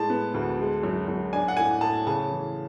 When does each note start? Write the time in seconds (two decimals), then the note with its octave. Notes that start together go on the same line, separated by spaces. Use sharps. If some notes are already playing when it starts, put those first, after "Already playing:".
Already playing: A2 G#3 A5
0.10 B3
0.34 D2
0.59 G#3
0.83 F#2
1.08 F#2
1.33 D4 G#5
1.48 F#5
1.57 A2 G#5
1.81 A2 A5
2.06 C#3 A5
2.31 E3